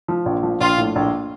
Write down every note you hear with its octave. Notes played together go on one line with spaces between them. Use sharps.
F3
A#1
F3
A#1 F4
A2
A#1